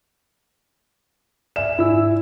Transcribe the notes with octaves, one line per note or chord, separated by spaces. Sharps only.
D5 E5 G#5 E7
G#2 E4 E6